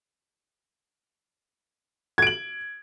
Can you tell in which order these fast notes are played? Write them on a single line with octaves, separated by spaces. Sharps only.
G#6 D7 F#7